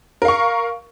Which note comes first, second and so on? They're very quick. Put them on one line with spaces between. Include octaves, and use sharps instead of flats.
A#4 F5 C#6